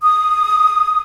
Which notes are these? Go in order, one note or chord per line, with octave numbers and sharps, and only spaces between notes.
D#6